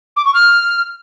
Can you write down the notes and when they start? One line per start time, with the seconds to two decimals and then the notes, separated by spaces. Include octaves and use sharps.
0.16 D6
0.25 C#6
0.34 F6